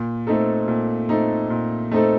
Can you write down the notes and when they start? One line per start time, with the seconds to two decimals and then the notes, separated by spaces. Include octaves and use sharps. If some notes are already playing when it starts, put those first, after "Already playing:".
Already playing: A#2
0.27 A3 C4 D#4 A4
0.68 A#2
1.09 A3 C4 D#4 A4
1.50 A#2
1.91 A3 C4 D#4 A4